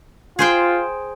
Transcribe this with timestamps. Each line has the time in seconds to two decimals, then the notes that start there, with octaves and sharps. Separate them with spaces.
0.39 F4 G#4 C5 G5